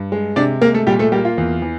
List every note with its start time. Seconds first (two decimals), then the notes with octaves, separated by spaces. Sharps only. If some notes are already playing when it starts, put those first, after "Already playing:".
Already playing: G2
0.12 G#3
0.36 C3 D4 D5
0.62 G#3 A#3 A#4
0.74 A3 A4
0.87 A#2 G3 G4
0.99 A3 A4
1.12 G3 A#3 G4
1.25 F4
1.38 E2
1.62 E3